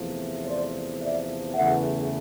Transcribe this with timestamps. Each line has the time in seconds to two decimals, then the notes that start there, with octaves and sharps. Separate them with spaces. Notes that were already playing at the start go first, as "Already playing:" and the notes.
Already playing: E2 C3 F3 A3
0.45 C5 D5
1.00 D5 E5
1.54 E2 C#3 E3 A3 E5 F#5